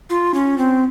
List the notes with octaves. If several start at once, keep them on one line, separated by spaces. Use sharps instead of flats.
F4
C#4
C4